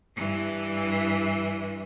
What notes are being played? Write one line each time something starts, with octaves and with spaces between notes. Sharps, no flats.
G2 E3